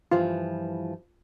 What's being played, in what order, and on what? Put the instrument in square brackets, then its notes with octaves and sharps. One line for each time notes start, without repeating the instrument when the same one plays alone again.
[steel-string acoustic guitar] G2 E3 F3 [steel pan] F4